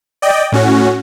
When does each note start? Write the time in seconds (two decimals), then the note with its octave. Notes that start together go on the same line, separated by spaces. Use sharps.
0.22 D5 D#5 G5
0.52 A2 C#4 F#4